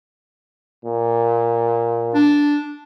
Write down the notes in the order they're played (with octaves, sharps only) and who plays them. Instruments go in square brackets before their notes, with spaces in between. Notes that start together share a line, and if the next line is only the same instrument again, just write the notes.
[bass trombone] A#2
[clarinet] D4